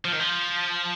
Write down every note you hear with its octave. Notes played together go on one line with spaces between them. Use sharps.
F3
D#3
F3